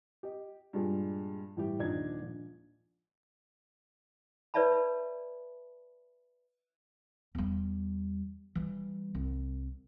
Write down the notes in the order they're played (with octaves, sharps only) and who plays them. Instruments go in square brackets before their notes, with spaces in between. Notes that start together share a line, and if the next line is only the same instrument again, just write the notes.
[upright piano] G4 D#5
G2 A#2 G3 G#3
A2 E3 G3 E4 G4
D#1 F3 D4 D#4 D5 G#6
A#1
[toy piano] B4 C#5 D5 E5 A5 B5
[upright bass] E2 G3
E3 G3
C2